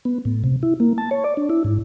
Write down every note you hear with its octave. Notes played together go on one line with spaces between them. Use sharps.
B3
A2
C3
E4
A#3
A5
C#5
D5
D4
E4
G#2